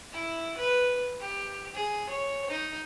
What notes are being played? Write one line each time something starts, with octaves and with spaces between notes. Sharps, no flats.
E4
B4
G4
G#4
C#5
D#4